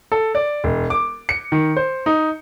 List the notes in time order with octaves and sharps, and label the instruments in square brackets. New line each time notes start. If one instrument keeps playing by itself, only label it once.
[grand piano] A4
D5
E1
D6
C#7
D#3
C5
D#4